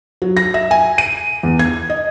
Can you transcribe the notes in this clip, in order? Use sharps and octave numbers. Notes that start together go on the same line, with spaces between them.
F#3
A#6
E5
G#5
D#7
E2
G#6
D#5